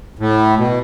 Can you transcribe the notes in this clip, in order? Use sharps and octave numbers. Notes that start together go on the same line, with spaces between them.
A2
B2